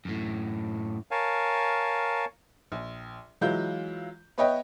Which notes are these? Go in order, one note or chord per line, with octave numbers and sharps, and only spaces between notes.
F#2 A2
A#4 C#5 F5 G#5 A5
A#1
E3 F#3 G#3 E4 F4 G6
B3 B4 C#5 D#5 E5 G5